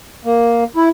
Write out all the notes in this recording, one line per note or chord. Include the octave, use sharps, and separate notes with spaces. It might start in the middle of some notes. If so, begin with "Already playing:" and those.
A#3
E4